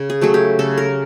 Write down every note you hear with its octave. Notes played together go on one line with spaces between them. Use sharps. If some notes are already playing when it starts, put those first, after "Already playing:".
Already playing: C#3
G#4
F#3 A3 G#4
G4
C#3 A4
A#4